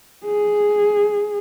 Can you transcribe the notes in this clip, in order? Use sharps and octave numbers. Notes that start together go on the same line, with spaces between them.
G#4